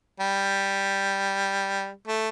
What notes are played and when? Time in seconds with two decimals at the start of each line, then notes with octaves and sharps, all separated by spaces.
0.20 G3
2.08 A3